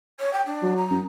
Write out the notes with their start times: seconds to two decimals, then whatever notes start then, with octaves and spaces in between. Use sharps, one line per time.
0.19 C#5
0.33 G5
0.46 D4
0.63 F#3
0.76 A#5
0.90 F#2